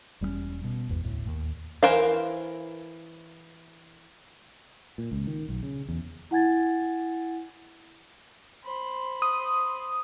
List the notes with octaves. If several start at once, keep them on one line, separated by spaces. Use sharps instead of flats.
E1 G3 A3 C#4
B2
G#1 E2
D2 A2
D#2
E3 A#4 C5 F5
A#2
C#2
D#3
B1
C#3
E2
E4 F#5 G#5 G#6 A6
C5 B5
D#6